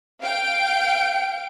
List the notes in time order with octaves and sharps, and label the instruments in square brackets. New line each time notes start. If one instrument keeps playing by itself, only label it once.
[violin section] F5 G5 D7